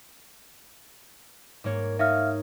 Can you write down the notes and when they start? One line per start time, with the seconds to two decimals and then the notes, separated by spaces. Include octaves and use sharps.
1.64 G#2 A#3 C#5
1.99 D#4 C#5 E5 F5 F6